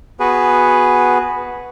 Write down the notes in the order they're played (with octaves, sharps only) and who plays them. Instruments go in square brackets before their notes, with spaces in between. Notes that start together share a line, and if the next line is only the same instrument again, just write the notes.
[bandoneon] B3 F#4 G#4 B4